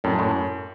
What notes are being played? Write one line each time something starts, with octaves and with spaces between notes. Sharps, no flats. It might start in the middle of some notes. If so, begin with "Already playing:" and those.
F#2 A2
A2